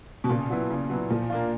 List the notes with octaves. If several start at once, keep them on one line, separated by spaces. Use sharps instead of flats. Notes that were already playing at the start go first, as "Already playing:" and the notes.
B2
A#2 C#3
F#3 B3 E4
C#3
F#3 B3 E4
A#2 F3
A#3 D4 F4